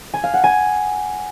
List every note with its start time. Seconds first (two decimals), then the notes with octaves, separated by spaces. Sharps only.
0.14 G#5
0.24 F5
0.34 F#5
0.44 G#5